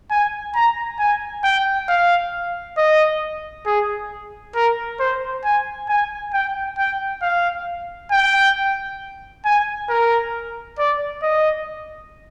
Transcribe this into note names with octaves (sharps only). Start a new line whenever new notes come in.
G#5
A#5
G#5
G5
F5
D#5
G#4
A#4
C5
G#5
G#5
G5
G5
F5
G5
G#5
A#4
D5
D#5